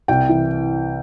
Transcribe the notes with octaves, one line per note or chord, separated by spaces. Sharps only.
C2 G5
E3